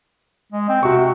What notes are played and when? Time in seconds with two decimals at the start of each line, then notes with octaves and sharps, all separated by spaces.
0.52 G#3
0.68 C4
0.83 C3 F#4 C#6